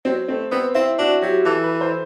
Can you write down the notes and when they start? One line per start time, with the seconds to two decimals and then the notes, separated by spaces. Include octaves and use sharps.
0.05 F#3 C4
0.28 A3 C4
0.51 B3 C4
0.75 C4 E4
0.99 D4 F#4
1.22 F#3 G4
1.45 E3 A4
1.63 B4
1.81 C5